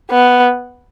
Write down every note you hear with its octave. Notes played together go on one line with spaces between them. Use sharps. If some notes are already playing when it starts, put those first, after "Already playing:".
B3